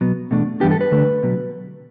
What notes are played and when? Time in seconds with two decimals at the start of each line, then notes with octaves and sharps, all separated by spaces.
0.01 B2 F#3 B3
0.31 E2 B2 A3 D4
0.60 G2 E3 G3 B3 D4 G4
0.71 A4
0.81 B4
0.91 D2 D3 A3 D4
1.23 B2 F#3